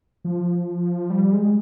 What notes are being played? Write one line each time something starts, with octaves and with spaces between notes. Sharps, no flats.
F3
G3
G#3